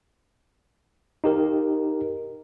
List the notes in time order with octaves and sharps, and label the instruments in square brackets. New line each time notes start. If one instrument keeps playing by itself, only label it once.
[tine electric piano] D#4 G4 A#4